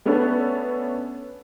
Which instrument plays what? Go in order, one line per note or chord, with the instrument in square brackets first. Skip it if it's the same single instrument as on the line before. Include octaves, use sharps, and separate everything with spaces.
[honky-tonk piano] A3 B3 C#4 D4 A4 B4